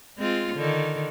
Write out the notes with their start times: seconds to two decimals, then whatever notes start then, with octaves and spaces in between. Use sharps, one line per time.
0.18 G#3 C4 F4
0.55 D3 D#3